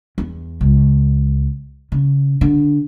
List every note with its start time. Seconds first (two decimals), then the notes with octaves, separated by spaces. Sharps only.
0.18 E2
0.61 C#2
1.92 C#3
2.41 D3